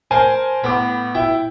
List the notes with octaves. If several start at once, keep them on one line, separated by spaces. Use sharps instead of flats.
A#4 C5 G#5 A5
A2 B3 D6
E4 G5